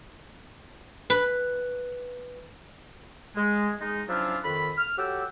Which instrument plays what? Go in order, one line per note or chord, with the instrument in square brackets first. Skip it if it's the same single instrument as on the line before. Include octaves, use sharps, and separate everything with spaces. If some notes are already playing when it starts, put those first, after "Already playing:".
[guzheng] B4
[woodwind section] G#3
G#3 D#4
F3 F#3 C#4 D4 E4 F4
F2 D#3 A4 B5
F6
F#3 G4 A4 F#5 G5 E6